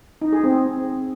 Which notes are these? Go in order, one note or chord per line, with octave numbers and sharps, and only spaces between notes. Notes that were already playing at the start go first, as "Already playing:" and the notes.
D#4
G#4
C4